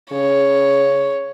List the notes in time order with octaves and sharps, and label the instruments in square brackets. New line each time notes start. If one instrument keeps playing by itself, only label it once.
[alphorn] C#3 [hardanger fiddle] C#5